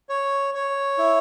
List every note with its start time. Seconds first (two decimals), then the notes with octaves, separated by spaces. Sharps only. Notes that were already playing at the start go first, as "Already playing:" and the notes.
0.09 C#5
0.54 C#5
0.98 E4